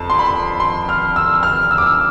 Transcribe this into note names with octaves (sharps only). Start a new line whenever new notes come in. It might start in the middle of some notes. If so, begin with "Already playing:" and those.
Already playing: F2 A5
C6
B5
C6
F6
E6
F6
E6
D6
E6